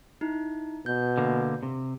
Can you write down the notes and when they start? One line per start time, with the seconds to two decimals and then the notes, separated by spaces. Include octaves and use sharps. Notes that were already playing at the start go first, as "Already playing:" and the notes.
0.21 D#4 E4
0.86 B2 G6
1.18 D3 A#3
1.63 C3